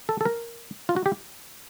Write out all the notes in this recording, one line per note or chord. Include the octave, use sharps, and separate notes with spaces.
A4
A4
A#4
F4
F#4
G4